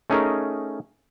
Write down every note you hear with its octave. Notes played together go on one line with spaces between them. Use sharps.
A3 C#4 D#4 G#4 A#4